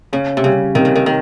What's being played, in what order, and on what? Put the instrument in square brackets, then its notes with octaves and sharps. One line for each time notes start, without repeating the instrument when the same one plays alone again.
[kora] C#3 [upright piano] C#4
[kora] C3
[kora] C#3 [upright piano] G3
[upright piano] C3 [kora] D#3
[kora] C#3
D#3
D#3